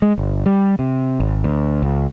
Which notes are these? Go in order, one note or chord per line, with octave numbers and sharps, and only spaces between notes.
G#3
G1
G3
C3
G#1
D2
C#2